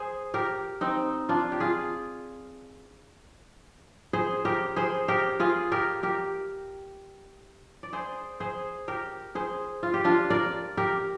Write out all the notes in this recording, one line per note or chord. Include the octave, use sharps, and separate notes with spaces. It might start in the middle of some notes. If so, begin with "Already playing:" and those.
Already playing: G#4 C5
G4 A#4
C4 D#4
D4 F4
G4
F4 G#4
G#4 C5
G4 A#4
G#4 C5
G4 A#4
F4 G#4
G4 A#4
G4 A#4
D5
G#4 C5
G#4 C5
G4 A#4
G#4 C5
F4
G4
D4 F4
A#4 D5
G4 A#4